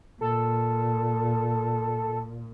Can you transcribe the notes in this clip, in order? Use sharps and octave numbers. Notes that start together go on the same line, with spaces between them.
A#2 A4